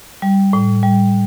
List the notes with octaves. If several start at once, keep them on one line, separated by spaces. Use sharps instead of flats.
G3
A2
G3